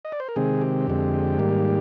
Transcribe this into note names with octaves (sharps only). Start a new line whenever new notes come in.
D#5
D5
C5
A#4
C3 D#3 G#3 C4 G#4
G4
F2 D3 G#3 C4
G#2 D#3 G3 A#3